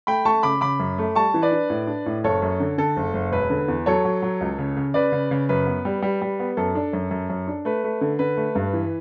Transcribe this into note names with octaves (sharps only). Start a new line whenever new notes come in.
A3 G5 B5
A3 A5 C#6
C#3 B5 D6
C#3 B5 D6
F#2
A3
G3 A5 C#6
E3
B4 D5
D4
A2
D4
A2
F#1 A4 C#5
F#2
D3
D3 A4
F#1
F#1
E1 B4
D3
E2
F#3 A4 C#5
F#3
F#3
C#2
C#3
C#3
C#3 B4 D5
C#3
C#3
F#2 B4
B3
G3
G3
G3
B3
F#2 A4
D4
F#2
F#2
F#2
D4
A3 B4
A3
D3
D3 B4
A3
G2
E3